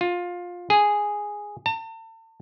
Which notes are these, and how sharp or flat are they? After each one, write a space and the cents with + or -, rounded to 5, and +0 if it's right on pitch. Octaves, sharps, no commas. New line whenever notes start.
F4 +20
G#4 -5
A5 +40